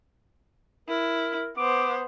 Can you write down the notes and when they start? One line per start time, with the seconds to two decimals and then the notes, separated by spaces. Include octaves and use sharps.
0.89 E4 A#4
1.57 B3 C5 D6